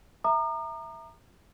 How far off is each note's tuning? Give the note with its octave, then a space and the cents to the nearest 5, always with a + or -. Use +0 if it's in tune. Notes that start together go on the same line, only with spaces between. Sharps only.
E5 +0 A#5 -10 D#6 -45